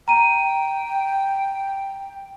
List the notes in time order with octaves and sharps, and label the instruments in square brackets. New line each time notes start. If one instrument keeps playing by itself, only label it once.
[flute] G5 [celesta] A#5 D#7